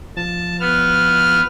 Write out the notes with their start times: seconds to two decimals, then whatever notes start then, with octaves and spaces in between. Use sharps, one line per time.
0.16 F3 A5
0.60 B3 F6